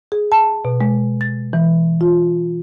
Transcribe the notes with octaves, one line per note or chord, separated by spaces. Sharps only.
G#4
A5
B2
G#3
A6
E3
F4